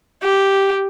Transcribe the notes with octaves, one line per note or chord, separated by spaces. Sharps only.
G4